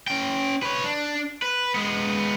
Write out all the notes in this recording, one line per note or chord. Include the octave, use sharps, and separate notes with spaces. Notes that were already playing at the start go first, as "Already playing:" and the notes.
C#4 G5
B4 C#5
D4
B4
G#3 B3